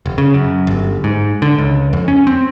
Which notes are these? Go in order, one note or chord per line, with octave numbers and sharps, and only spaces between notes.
F1
C#3
F#2
G1
G#2
D3
C#2
F2
C#4
C4